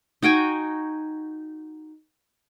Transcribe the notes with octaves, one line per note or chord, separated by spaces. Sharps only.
D#4 F#4 G5 G#5